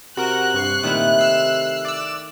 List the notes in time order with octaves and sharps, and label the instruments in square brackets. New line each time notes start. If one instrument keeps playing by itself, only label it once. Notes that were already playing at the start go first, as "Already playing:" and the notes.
[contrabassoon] C3 [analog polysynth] F#4 A#4 [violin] F#6
[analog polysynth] G2 C#6 C7
[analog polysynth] A#2 [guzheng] D#3 A3 E4
[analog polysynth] E6 C7
D5 E6